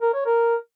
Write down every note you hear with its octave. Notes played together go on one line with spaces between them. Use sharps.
A#4
C#5
A#4